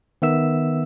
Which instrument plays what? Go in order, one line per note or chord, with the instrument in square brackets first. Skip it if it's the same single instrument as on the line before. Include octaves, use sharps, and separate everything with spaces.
[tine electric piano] D#3 B3 E5 E6